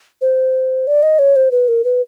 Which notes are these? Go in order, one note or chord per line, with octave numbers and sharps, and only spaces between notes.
C5
D5
D#5
C#5
C5
B4
A#4
B4